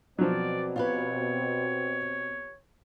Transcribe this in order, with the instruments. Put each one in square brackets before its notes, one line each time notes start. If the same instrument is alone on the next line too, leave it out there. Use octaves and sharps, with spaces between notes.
[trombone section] B2 C4 [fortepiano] F3 F#3 [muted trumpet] D5
[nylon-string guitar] F4 G4 B4 [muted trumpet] C#5